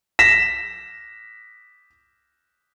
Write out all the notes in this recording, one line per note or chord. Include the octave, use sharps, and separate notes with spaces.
A#6 B6 E7